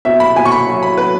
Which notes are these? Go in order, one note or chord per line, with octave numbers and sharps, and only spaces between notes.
B2 E5
B5
B2 G#5
C#6
B5
F#3
B5
F#3 B4